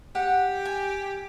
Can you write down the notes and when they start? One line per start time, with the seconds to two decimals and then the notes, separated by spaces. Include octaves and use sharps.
0.15 G4 F#5
0.65 G#5